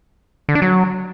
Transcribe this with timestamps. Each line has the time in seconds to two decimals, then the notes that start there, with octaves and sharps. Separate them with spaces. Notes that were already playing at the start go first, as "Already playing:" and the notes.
0.49 D3
0.55 D4
0.62 F#3